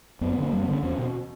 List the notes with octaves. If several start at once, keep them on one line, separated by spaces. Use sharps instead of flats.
F#2 B3
B3
D3
A#3
F#2 G3
B3
D3 C#4
E2 C#4
B2